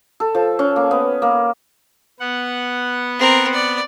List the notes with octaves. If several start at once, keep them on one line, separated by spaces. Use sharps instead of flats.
A4
F3
C#4
A#3
B3
A#3
B3 F#5
C4 A#4
D5